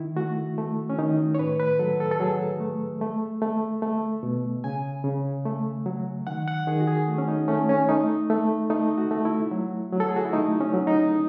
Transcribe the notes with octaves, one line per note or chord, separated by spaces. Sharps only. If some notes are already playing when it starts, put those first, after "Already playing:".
Already playing: D#3 E4
A3 F#4
A3
C#4
D#3 D#4
C#5
A2 B4
B4
F#3 A4
A4
A4
F#3 G#4
A3
A3
A3
A3
B2
C#3 G#5
C#3
A3
F#3
D#3 F#5
F#5
D#3 G#4
F#4
G#4
A3
C#4
D#4
A3 C#4
C#4
A3 D#4
A3
A3 D#4
F#4
A3
E4
F#3
F#3
A4
G#4
F#4
E4
A3 D#4
C#4
F#3
D#4